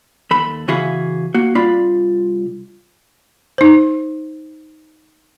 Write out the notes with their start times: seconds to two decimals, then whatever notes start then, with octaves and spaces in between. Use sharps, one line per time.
0.31 D#2 A4 B5
0.68 C#3 E3 F#4 G#4 E5 F5
1.34 A#3 F#4
1.55 C2 D4 F4 D5 B5
3.58 D#4 C5